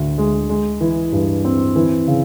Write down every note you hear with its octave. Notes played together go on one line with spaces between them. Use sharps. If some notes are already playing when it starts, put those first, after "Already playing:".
Already playing: D2 D3
G#3
G#3
E3
G2
C4
E3
C#3